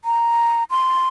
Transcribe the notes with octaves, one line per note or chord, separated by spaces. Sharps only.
A#5
C6